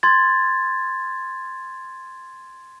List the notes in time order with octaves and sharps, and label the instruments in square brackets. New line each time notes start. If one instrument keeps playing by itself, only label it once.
[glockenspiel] C6 G#6 A6